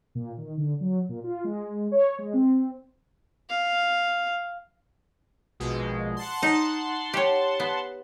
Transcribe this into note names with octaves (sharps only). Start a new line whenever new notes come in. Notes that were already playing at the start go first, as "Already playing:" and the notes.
A#2
D#3
D3
F#3
A#2
F4
G#3
C#5
G#3
C4
F5
A#1 B2 G#3
F#5 A5 C6
D#4
G4 C#5
B3